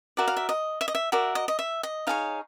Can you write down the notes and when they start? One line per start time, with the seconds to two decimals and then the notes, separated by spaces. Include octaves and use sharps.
0.17 F#4 A#4 D5 E5
0.28 F5
0.37 E5
0.49 D#5
0.81 E5
0.88 D#5
0.95 E5
1.12 F#4 A#4 D5 E5
1.35 D#5
1.48 D#5
1.59 E5
1.83 D#5
2.07 D#4 G#4 C#5 F5